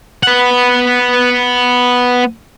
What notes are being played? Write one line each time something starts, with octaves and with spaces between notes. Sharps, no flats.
B3 F#5